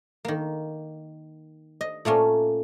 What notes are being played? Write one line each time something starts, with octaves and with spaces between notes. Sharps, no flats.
D#3 A#3
D#5
A#2 A3 A#3 C#4